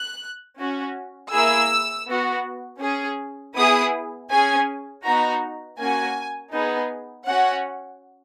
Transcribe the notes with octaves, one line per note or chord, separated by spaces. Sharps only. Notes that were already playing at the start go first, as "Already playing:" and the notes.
Already playing: F#6
C#4 F#4
A#3 E4 G#4 E6
B3 F#4
C#4 G#4
B3 E4 G#4 D#6
C#4 G#4 G#5
B3 D#4 F#4 A#5
A#3 C#4 F#4 G#5
B3 D#4 G#4
C#4 F#4 F#5